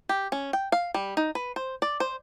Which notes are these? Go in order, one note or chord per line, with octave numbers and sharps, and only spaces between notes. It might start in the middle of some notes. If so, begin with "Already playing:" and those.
G4
C#4
G5
F5
G3
D#4
B4
C5
D5
C5